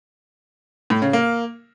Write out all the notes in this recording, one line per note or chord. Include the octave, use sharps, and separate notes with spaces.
A2
C#3
A#3